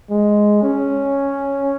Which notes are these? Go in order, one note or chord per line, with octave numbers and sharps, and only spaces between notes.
G#3
C#4